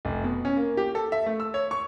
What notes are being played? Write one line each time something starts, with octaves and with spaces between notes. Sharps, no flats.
F1
B2
C#4
A#3
G4
A4
E5
A3
E6
C#5
C#6